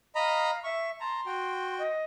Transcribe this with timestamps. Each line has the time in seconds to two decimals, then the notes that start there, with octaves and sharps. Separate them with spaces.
0.15 D#5 F5 A#5 B5
0.64 E5 C#6
1.00 A5 A#5 C6
1.26 F#4 G5
1.78 D#5